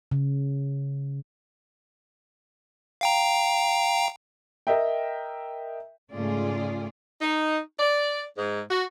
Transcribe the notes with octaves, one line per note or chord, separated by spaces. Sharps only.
C#3
F5 G5 A#5
A#4 D#5 E5 G5
G#2 C#3 A3 F4 G#4 D5
D#4
D5
G#2
F#4